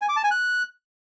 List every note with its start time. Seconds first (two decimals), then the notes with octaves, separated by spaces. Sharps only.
0.02 G#5
0.09 D6
0.16 A5
0.24 G#5
0.31 F#6